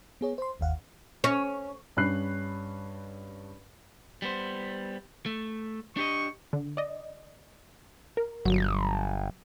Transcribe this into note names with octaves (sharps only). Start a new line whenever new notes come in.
B3 G#4 C#5
C5 C6
G1 D#2 F5 F#5
C#4
G2 C#4 B5 F#6 C7
G3 B3 C5
A3
D4 G4 D#5 C#6
D3
D5 D#5
A#4
G1 F#3